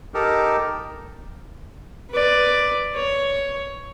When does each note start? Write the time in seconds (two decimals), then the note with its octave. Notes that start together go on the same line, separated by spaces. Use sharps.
0.14 D#4 G4 A4 A#4
2.10 B4 D5
2.94 C#5